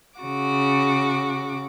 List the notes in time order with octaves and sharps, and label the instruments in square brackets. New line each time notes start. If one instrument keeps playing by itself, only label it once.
[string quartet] C#3 F#4 D6